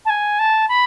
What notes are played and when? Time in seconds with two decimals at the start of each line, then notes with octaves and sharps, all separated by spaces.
0.05 A5
0.10 G#5
0.39 A5
0.69 B5